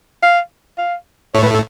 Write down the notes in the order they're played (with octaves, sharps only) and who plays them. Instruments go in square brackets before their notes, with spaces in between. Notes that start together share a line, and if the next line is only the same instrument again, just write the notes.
[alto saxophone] F5
F5
[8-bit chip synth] A2 A3 [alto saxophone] C#5
[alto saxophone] B4
A4